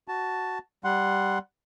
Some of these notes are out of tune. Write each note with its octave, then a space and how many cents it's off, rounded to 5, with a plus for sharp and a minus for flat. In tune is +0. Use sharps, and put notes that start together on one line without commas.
F#4 +5 A5 +0
G3 -5 F#5 +0 C6 +0